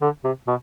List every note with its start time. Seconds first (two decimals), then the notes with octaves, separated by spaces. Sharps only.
0.02 D3
0.24 C3
0.47 B2